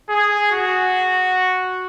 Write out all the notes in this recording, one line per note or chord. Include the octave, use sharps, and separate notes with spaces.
G#4
F#4